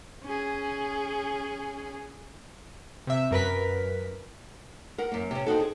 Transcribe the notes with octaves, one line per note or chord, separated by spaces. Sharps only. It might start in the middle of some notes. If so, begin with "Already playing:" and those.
C#4 G#4
C3 E5
F#2 A#4 B4 B6
A#4 F#5
F#2 A#3
C3 C#4
C4 D#4 F#4 A4
G#4